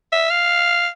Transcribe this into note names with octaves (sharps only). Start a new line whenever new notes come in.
E5
F5